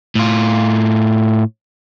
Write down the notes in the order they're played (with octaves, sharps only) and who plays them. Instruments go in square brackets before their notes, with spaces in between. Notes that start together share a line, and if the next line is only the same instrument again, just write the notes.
[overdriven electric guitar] A2 F4